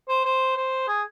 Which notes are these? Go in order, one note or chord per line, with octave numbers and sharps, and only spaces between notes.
C5
C5
C5
G#4